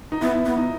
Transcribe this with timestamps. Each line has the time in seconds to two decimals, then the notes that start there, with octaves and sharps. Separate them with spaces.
0.12 D#4
0.21 B3 E4
0.45 B3
0.57 D#4